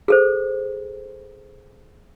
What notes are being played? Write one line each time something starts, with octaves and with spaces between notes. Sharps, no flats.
G#4 A4 C5